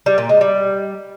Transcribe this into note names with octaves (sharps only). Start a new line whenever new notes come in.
G3
A#2
G#3
G3